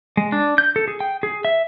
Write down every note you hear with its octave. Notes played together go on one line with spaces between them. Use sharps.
G#3
D4
G6
A4
G#4
G5
G#4
E5